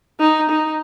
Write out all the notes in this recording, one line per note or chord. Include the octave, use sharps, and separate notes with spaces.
D#4
D#4